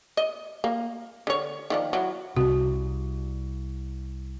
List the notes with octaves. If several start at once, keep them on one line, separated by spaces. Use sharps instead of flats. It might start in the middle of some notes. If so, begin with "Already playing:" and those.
D#5
A#3
D3 C#5
D#3 F3 D4
F#3 E4
C2 C3 F#4